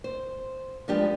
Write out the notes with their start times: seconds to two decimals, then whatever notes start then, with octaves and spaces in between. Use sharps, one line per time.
0.04 C5
0.88 F3 G#3 D4 G4 B4